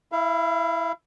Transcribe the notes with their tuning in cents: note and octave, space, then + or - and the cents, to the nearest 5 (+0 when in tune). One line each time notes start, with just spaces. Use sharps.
E4 +0 F5 -40